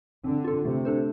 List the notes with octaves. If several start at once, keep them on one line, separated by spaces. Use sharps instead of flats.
D3 C4
F4 A4
C3 A3
D4 A4 C5